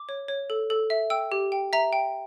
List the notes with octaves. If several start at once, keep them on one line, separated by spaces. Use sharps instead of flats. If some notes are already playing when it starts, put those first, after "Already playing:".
Already playing: D6
C#5
C#5
A4
A4
E5
G5 E6
G4
G5
E5 A#5
G5